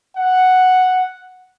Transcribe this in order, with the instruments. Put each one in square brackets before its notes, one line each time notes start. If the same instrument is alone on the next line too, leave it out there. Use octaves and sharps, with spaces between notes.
[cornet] F#5